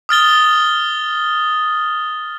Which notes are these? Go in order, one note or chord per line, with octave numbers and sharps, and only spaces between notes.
D#6 F6 A6 G7